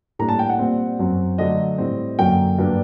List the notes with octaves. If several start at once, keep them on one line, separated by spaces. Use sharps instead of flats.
A2 G3 A#3 D4 A#5
A5
G5
F#5
A#2 G3 C4
F#2 F#3 C4
D3 F#3 A3 D#5
A2 G3 C4
F#2 D3 F#3 A#3 G5
G2 F#3 A#3 D4